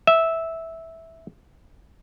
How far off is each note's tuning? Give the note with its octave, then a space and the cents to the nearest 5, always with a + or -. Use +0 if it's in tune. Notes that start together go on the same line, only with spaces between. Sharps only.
E5 -10